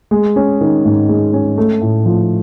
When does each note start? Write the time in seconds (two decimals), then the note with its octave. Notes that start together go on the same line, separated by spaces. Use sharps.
0.11 G#3
0.36 C#4
0.61 D#3
0.85 G#2
1.09 G#3
1.33 C#4
1.58 A3
1.82 A2
2.06 F3